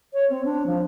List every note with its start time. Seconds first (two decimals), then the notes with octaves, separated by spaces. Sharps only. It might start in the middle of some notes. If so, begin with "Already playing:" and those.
0.13 C#5
0.30 C4
0.45 D4
0.66 F3